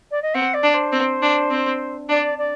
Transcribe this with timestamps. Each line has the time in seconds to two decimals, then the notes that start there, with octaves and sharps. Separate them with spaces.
0.11 D5
0.22 D#5
0.34 C4 F#5
0.54 D5
0.63 D4
0.74 C5
0.93 C4
1.22 D4
1.51 C4
2.09 D4 D5
2.38 D5